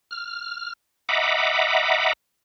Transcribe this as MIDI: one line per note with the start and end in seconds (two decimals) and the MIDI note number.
0.11 0.73 89
1.09 2.13 75
1.09 2.13 76
1.09 2.13 78
1.09 2.13 82
1.09 2.13 83
1.09 2.13 86